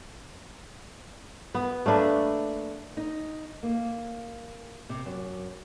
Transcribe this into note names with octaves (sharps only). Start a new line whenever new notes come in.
B3
A3 A#3 D4 B4
D#4
A#3
C3
F#2